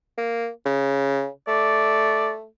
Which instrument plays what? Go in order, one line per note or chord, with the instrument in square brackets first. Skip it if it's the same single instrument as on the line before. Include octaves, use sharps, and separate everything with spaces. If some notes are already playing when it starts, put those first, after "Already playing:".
[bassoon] A#3
C#3
[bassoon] A3 [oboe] D5